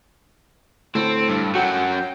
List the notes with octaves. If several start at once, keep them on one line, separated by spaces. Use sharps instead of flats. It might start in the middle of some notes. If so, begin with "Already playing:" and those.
D2 A2 C4 A4
G2
F#2 F#3 F#4 G5